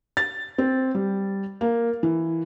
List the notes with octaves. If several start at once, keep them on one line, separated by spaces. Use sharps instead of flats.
A6
C4
G3
A#3
E3